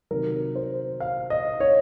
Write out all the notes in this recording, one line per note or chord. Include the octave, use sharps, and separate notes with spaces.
C3 D#3 F#3 A#4
C5
F5
D#5
C#5